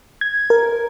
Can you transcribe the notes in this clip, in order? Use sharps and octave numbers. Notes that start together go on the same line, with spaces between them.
G#6
A#4